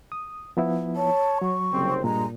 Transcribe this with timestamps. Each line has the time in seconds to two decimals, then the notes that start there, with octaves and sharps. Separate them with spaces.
0.12 D#6
0.57 F3 B3 E4
0.96 C#5 A5
1.42 F#3 C#6
1.72 F#1 C2 C4
2.04 G2 A#2 G#3 A#5